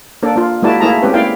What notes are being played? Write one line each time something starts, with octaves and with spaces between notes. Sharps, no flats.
A#3 D4 A4 D5
A#3 F4
G#3 A#3 E4 F#4 D5 A5
A3 A#3 E4 G#4 A5 A#5
G#3 C4 C#4 G4 B4
A#3 E4 D5 F5 G5